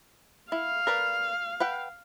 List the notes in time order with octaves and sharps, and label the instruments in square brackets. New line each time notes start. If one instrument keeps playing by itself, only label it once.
[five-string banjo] E4 [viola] F5
[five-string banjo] A#4 B4 D5
B4 F#5 G5